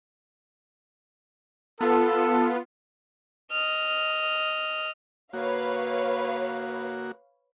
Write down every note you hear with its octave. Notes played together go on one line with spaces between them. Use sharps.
B3 F4 A4
D#5 F6
A#3 F#4 B4 C#5 F5